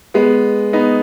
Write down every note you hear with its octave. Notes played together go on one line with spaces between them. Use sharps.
G#3 B3
B3 D#4